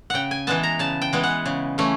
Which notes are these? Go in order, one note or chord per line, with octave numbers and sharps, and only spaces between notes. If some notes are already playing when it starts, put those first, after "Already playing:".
C#3 F#5 G5
G#5
E3 G#3 B3 A5
A#5
C#3 A5
G5
E3 G#3 B3
F#5
C#3
E3 A3 C#4